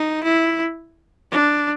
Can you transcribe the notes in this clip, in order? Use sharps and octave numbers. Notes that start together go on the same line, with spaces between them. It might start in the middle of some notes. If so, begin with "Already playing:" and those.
Already playing: D#4
E4
D4